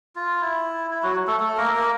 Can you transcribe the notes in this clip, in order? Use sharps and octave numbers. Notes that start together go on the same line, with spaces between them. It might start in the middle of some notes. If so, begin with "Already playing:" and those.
F4
E4
E4
F#3 F#4
A3 A4
A3 A4
A#3 A#4
A#3 A#4